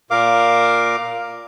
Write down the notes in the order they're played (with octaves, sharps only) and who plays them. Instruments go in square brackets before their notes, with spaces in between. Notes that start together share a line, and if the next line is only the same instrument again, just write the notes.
[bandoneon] A#2 A#4 F5 D6